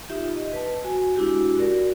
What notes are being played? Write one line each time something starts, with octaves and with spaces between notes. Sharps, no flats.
D#4 F4 G4 E5
D#5
B4 A5
F#4 G#5
G#3 D4 E4 F#4 G4
F#4 A#4 D5